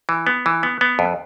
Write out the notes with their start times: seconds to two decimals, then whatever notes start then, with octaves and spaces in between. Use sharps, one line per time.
0.09 E3
0.27 B3
0.46 E3
0.63 B3
0.81 B3
0.99 F2